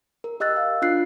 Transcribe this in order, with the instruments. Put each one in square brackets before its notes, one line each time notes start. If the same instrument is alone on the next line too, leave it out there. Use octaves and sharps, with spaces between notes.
[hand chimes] A#4
G4 D#5 E6 F#6 A6
F5
D4 F4 F#6 C7